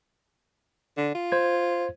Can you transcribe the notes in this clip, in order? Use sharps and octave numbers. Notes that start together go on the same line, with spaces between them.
D3
F4
C5 G#6